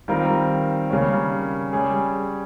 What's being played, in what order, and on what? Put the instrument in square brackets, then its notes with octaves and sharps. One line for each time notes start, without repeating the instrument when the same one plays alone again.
[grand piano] D#3 G3 C4 F4 A#4
C#3 G3 A#3 C#4
G3 C#4 G#4